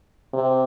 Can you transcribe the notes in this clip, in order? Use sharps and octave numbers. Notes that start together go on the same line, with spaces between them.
C3